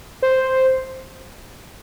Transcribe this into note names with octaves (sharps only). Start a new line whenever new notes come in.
C5